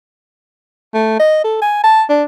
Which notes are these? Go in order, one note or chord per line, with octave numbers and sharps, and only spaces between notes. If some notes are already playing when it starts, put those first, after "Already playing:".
A3
D#5
A4
G#5
A5
D4